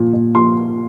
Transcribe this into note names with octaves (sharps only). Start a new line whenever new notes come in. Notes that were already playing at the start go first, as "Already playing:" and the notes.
Already playing: A#2 F3
A#2
F3 C6